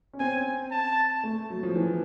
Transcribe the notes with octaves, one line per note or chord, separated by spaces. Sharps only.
C#4
C4 G#5
A5
A3
F#3
F3
E3